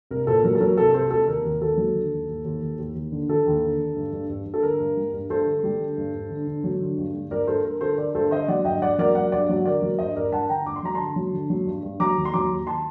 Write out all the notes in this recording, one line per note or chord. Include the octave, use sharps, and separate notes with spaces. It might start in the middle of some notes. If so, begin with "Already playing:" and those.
C2 A#4
A#2 A4 C5
F#3 A#4
A4
F#3 A#4
C2 A4
C2 A4 C5
C2 A4
D#2 A#4
D#2
D#2 A4
F#3
D3
D#2
D#2
D#2
D#2
D#2
D#2
D3
D3 A4
D#2
D3
D3
G2
G2
G2
G2
A4
D3 A#4
G2
G3
G2
G2 A4 C5
D3
G3
D3
G2
G2
D3
D3
F#3
D3
G2
G2
G2 A#4 D5
G2 A4 C5
G2 A#4
D3 A4 C5
D3 A#4 D5
G2 A4 C5
D3 C5 D#5
F#3 D5 F#5
G2 D#5 G5
G2 D5 F#5
F#3 A#4 D5
F#3 D5 F#5
G2 D5 F#5
F#3
D3 A#4 D5
F#3
G2 C5 D#5
G2 A#4 D5
G2 F#5 A5
D3 G5 A#5
G2 D6
C6
F#3 A#5
D3 A5 C6
F#3
D3
F#3
G2
G2
F#3 A#5 D6
D#2
C6
F#3 A#5 D6
D#2
A5 C6